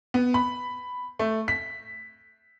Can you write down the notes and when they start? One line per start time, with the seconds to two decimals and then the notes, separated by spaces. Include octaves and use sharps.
0.14 B3
0.34 B5
1.19 A3
1.48 B6